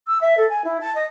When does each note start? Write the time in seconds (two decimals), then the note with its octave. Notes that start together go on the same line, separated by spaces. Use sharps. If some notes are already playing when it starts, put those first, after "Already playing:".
0.07 E6
0.21 E5
0.38 A4
0.50 G#5
0.64 E4
0.81 A5
0.95 D#5